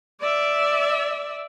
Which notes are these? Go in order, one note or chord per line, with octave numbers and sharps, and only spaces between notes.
D5 E5